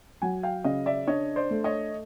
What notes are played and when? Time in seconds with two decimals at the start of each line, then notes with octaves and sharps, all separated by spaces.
0.22 F#3 F#5 G#5
0.43 F5 G5
0.64 C#3 D#5 F5
0.86 D5 E5
1.07 D4 C#5 D#5
1.36 C5 D5
1.50 A3
1.64 C#5 D#5